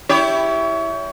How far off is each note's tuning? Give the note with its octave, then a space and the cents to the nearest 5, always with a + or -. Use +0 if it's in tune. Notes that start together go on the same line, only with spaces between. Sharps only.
E4 +0 G4 +0 C#5 +30